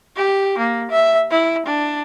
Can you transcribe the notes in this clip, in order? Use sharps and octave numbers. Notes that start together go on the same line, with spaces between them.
G4
A#3
E5
E4
D4